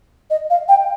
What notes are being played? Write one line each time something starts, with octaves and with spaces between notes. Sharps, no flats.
D#5
F5
G5